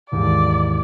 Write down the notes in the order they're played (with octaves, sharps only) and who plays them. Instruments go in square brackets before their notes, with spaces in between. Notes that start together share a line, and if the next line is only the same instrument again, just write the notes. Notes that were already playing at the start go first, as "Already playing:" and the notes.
[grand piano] D#2 G#2 E3 [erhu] D5